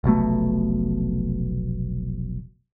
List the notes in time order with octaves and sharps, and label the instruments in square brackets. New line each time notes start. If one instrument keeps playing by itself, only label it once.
[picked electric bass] F1 B1 B2 A3